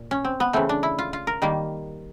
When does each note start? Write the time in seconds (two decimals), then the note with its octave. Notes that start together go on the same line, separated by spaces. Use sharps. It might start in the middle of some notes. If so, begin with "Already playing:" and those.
Already playing: A#2
0.11 C#4
0.25 C4
0.40 B3
0.53 C#3 E3 A3 C4
0.69 D4
0.83 E4
0.99 F4
1.13 F4
1.27 A#4
1.42 D#3 G3 A#3